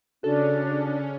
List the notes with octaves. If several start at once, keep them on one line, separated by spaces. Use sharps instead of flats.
C#3 C#4 D4 F#4 A4